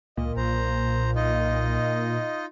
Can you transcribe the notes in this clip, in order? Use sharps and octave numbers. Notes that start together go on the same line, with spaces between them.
C#2 A#2 D#5
B1 C5 A#5
D#4 F4 D#5